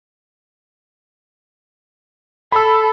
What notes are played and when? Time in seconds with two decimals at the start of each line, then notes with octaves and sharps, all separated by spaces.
2.52 A4 B5 E6